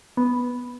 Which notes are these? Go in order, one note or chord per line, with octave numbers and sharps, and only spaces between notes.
B3